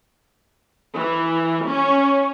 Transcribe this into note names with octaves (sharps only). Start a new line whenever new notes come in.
E3
C#4